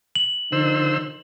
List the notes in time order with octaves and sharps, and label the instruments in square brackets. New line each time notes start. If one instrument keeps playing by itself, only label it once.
[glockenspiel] F#7
[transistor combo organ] D3 C5 E6 [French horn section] D#3 F3 D#4